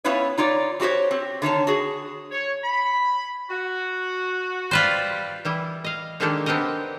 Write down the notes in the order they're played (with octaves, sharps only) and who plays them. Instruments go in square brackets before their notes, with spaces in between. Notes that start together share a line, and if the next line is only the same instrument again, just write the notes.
[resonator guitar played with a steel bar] B3 C#4 E4 F4 B4 C#5
D#4 F4 C#5 D5
G3 F#4 G4 C5 C#5
C4
D3 D#3 C#5 A5
F#4 G#4
[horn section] C#5
B5
[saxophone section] F#4
[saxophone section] G3 [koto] F4 B4 C5
[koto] E3 G3 E4
D#5 F5
D#3 G#3 A#3 D4 G4 A4
B3 C4 D4 G4 A#4 D#5